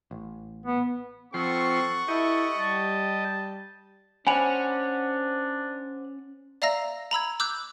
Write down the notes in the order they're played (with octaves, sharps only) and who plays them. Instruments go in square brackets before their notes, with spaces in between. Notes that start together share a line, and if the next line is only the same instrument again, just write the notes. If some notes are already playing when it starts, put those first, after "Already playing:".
[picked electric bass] A1
[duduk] B3
[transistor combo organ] F3 C6 [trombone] C4 [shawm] A4 [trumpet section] F#5 C#6
[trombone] E4 [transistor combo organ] G4 D#5 [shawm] A4
[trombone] G3 [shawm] A5
[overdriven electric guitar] C#4 [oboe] D4 [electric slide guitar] C5 F#5 [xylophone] G#5 B5 F7
[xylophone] D5 E5 F5 A#5 E6 A#6
A#5 B5 E6 G#6
D6 E6 F#6 G6